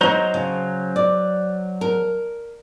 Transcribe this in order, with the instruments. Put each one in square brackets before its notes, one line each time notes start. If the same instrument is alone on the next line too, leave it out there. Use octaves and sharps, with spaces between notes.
[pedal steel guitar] F#3 C5 A#5 [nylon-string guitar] D#4 C#5
[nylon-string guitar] C#3
D5
A#4